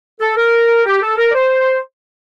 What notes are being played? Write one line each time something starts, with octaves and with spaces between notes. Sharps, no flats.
A4
A#4
G4
A4
A#4
D5
C5